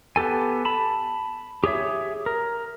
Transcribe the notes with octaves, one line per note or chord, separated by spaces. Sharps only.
B3 G4 A4 G#5
A5 B5
G4 G#4 C#5 E5
A#4